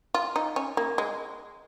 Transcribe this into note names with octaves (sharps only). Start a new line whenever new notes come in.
F4
D#4
C#4
A#3
G#3